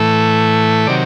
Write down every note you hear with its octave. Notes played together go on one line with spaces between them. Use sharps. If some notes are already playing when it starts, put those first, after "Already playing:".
Already playing: A2 E3 A3
C3 D#3 F#3 D5